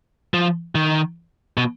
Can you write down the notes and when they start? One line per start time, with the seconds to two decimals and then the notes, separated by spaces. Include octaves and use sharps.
0.34 F3
0.75 D#3
1.57 B2